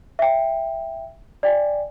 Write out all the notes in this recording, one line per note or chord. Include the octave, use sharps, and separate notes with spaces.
E5 G5
D5 G5 G#5